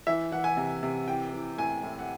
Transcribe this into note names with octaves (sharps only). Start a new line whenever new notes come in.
E3 E5
E3 F#5
G#5
C3
C3
E3 G5
E3
A2 G#5
A2
F#5